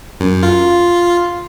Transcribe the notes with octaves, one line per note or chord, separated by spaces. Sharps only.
F#2
F4